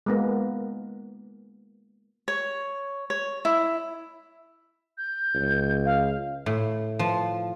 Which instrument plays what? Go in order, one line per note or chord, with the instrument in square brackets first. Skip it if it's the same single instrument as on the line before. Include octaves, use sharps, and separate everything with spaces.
[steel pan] G#3 A#3 B3
[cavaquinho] C#5
C#5
E4
[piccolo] G6
[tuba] C#2
[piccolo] F5
[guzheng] A2
F3